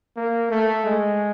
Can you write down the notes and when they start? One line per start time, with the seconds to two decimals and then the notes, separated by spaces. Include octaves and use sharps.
0.17 A#3
0.51 A3
0.86 G#3